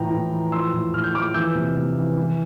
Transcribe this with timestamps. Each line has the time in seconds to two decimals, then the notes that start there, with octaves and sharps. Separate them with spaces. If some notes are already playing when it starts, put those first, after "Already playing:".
Already playing: A2 E3 F3 G5 A#5
0.11 A2
0.32 E3
0.52 F3 C6 E6
0.73 A2
0.93 A2 F6
1.04 G6
1.14 F3 D6 F6
1.34 E3 E6 G6
1.55 C3
1.77 C3
1.97 E3
2.17 E3